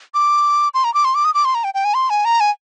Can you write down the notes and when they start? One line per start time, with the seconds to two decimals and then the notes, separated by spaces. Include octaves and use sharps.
0.14 D6
0.74 C6
0.84 A#5
0.94 D6
1.05 C6
1.15 D6
1.25 D#6
1.34 D6
1.45 C6
1.55 A#5
1.64 G5
1.74 G5
1.85 G#5
1.94 C6
2.10 G#5
2.25 A#5
2.40 G#5